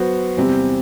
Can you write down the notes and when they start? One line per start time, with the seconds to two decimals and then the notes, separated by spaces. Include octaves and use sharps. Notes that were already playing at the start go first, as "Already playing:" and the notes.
Already playing: F#3 B3 F#4 C5
0.37 E2 C3 G3 C4 G4